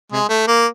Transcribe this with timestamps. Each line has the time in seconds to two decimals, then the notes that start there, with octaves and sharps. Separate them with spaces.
0.12 C3 G#3
0.29 A3
0.47 A#3